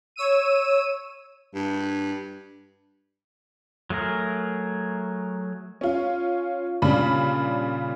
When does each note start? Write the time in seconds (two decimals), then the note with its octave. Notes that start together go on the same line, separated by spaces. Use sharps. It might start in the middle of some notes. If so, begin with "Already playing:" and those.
0.16 C#5 E6 D#7
1.55 G2
3.90 F#3 A3 G#4 A#4
5.81 C#4 F4
6.82 A#2 C#3 G3 D4 B5